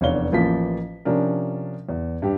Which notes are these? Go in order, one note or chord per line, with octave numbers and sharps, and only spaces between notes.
F1 E2 D4 C#5 F5 G7
A1 E3 F3 A#3 F4 B6
C3 F3 C#4 D4 A#4
E2
G2 G4